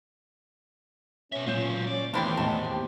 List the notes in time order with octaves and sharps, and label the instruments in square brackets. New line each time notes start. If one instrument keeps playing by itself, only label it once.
[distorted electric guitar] B2 E5 [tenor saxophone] C#4
[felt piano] A#2 G6 E7 [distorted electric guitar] F#3 F4 [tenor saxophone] C#4
[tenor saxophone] C#4 [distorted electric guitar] D5
[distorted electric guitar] D#2 [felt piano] E3 A3 B3 [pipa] D4 E4 G5 [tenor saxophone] C5
[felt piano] E2 A2 D#5 [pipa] A5
[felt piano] G4 G5